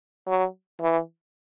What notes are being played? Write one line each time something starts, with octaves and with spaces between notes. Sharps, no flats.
F#3
E3